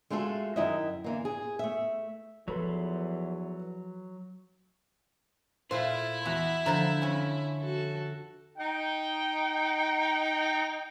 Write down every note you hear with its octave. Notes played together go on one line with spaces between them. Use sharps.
G#3 A3 F4 F#4 A4 E5
F#2 D#3 E4 D#5 E5
D3 E3 A#3
G#4
A3 E5
E2 F3 F#3 A4 B4 B5 C6
A#2 A3 E4 F4 C5
E2 B3 F#4 E5 A#5
D3 F3 C5 A#5
F2 C#4
F#4 A4
D#4 G5